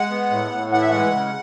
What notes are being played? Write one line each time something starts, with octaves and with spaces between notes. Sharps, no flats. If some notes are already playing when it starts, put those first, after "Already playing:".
Already playing: G#3 F#5
B3
A2
A2
E3 F#5
E5
G#3 F#5
C#3